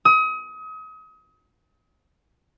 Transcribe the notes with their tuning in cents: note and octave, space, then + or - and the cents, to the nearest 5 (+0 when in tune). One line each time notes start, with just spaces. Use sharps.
D#6 +35